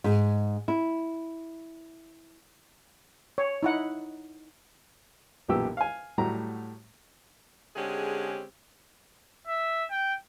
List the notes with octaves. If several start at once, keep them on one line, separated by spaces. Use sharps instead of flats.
G#2
E4
C#5
D#4 E4 F#5
B1 F#2 A#2 E3 G4 E6
F5 G#5
A2 F#3 G3 A3 F#4 A#5
D3 G#3 C4 C#4 G4 G#4
E5
G5